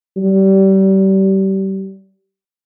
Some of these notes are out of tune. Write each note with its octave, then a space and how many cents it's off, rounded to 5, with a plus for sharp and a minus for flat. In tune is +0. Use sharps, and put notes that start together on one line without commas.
G3 -30